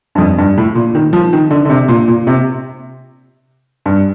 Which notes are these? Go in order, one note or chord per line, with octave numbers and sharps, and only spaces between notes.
G2
F2
G2
A2
A#2
D#3
F3
D#3
D3
D3
C3
A#2
A#2
C3
G2